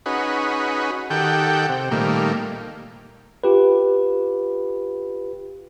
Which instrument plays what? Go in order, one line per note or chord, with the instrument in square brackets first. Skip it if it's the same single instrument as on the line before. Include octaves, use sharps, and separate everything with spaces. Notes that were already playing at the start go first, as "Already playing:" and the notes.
[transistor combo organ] C#4 D#4 F#4 G#4 B4
D#3 G4 A4 F#5 G5
C3
A#2 D#3 G3 A3 A#3
[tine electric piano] F4 G4 B4